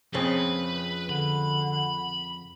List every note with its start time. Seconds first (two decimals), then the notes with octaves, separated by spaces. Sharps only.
0.14 F2 C#3 C4 B4
1.10 D3 B5